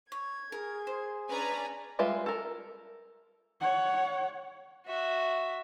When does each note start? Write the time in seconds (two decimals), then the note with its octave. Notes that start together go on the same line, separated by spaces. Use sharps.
0.12 C#5 G#6
0.52 G#4 A#4
0.87 C5
1.29 C#4 D4 B4 D5 G#5 A#5
1.99 G3 G#3 F4 B4 E5
2.26 A4 A#4
3.60 C#5 F#5
4.87 F#4 E5